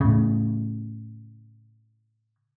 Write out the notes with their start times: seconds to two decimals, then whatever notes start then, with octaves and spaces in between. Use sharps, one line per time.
0.01 A2 C#3